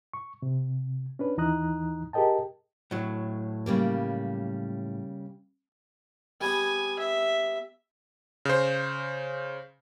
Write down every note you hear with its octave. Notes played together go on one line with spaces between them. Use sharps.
C#6
C3
C#4 D4 B4
D#2 E3 D#4 A#5 D#6 F#6
G4 G#4 A#4 D#5 G5 A5
A2 F#3
C#3 G3 A#3
G3 B3 G#4 G#5
E5
C#3 C5